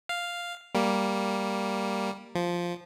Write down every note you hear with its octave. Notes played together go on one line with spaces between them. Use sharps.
F5
G3 A#3
F3